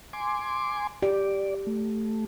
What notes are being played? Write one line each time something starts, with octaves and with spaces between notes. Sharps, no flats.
G#5 C6 D6
G4 D5
A3